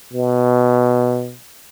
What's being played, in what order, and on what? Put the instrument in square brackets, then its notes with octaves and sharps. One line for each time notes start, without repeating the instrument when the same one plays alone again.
[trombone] B2